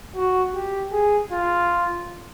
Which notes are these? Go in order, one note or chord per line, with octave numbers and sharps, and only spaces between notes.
F#4
G4
G#4
F4